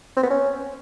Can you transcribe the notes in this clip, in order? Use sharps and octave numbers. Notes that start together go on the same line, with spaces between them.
C4
B3
C#4